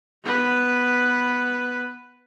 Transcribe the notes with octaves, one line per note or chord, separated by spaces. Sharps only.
B3 B4